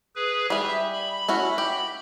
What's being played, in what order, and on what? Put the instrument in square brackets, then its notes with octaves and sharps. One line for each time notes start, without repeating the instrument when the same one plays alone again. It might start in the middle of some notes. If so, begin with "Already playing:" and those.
[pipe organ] G#4 B4
[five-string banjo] G3 G#4 [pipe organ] E5
[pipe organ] B5
[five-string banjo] C#4 E4 F#4
G4